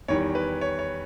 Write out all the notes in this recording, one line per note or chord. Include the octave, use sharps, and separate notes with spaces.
E2 D#3 G3 C#5
B4
C#5
C#5